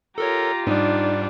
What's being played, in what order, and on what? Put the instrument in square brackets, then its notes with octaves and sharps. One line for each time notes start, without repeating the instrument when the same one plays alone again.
[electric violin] F4 G4 [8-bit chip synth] A4 A#4 C#5 [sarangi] A#5
[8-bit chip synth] G#2 G3 [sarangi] D4 [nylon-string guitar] D#4